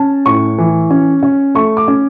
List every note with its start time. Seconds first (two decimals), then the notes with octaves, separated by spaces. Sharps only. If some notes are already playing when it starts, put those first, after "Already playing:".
Already playing: C#4 A5
0.26 A2 C#6
0.58 E3
0.90 C#4
1.23 C#4
1.55 A3 C#6
1.77 D6
1.88 C#4